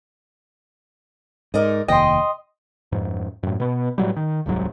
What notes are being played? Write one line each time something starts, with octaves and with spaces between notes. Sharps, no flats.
G#2 A#4 D5 D#5
F1 D#2 D#5 G5 C6
F2 G#2
F#2 A2
B2 B3
A2 C3 F#3 G3
D#3
D#1 C2 G#2 F#3